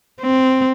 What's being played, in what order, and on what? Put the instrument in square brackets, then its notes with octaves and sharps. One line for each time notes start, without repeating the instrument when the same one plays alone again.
[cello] C4